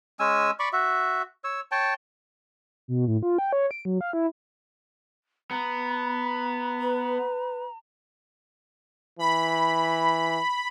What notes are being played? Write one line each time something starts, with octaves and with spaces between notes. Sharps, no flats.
G#3 C#4 G#5 E6
D5 B5 C#6
F#4 E5
C#5 E6
C#5 G5 A5
B2
A2
F4
G5
C#5
D7
F#3
F5
E4
B3 A#5
B4
E3 B5